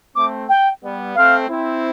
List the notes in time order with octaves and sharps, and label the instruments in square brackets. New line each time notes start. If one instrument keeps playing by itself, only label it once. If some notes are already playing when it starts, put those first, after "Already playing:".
[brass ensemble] A3 C4 [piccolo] D6
[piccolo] G5
[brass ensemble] G3 B3
[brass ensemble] A3 C4 [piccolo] F5
[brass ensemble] C4 E4